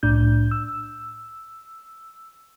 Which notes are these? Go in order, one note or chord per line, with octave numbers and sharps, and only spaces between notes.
C2 A2 D4 G6
E6